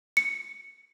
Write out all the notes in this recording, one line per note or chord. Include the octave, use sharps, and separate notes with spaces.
C#7